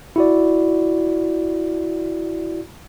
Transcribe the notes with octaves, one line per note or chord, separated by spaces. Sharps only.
E4 F#4 D5